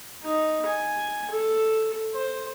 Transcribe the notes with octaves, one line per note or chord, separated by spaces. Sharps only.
D#4
G#5
A4
C5